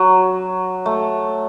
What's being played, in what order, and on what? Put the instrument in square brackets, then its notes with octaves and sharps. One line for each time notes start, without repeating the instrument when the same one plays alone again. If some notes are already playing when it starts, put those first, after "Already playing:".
Already playing: [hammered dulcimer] F#3
A3